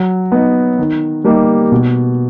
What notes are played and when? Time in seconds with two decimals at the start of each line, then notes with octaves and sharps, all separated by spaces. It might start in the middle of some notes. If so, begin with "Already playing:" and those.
Already playing: F#3
0.32 B3 D#4
0.79 D#3
1.24 G3 A#3 D#4 G4
1.72 B2